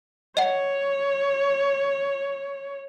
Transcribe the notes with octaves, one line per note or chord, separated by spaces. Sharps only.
C#5 D#5 F#5